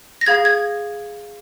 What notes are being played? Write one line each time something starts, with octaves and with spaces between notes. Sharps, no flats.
A#6
G#4 F5 G#6
G#6